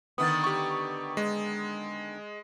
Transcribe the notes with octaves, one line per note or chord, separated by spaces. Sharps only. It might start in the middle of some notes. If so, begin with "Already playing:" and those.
D3 D#3 B3 D#6 A6
G4 C#6
G#3